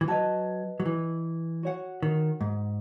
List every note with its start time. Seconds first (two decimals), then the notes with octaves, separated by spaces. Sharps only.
0.01 E3
0.08 F#3 B4 D#5 A5
0.80 F#3
0.86 E3
1.63 F#4 C#5 F#5
2.03 D#3
2.41 G#2